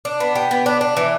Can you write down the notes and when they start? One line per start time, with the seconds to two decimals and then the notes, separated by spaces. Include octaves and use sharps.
0.05 D4
0.20 B3
0.35 G4
0.51 B3
0.66 D4
0.81 D4
0.97 E3